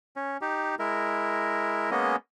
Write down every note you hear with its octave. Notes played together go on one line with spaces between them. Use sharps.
C#4
D#4 G4
G#3 E4 A#4
G#3 A#3 B3 C#4 D#5